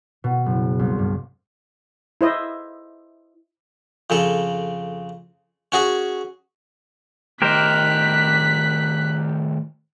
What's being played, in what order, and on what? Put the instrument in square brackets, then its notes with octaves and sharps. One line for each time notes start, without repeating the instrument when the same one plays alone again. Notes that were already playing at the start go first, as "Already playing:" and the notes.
[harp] B2
F#1
C2
G2
[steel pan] E4 C5 D#5 E5
[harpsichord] F2 C#3 A4
C#4 F#4 G#4
[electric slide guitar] A2 D#3 D#5 [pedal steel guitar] G4 A#4 C5 [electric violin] F#6 B6